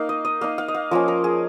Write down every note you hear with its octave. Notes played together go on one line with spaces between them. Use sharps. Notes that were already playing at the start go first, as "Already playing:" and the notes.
Already playing: A#3 D#4 F5
D#5
D#5
A#3 D#4 F5
F5
D#5
F5
F3 A#3 C#4 A#4
A#4
G#4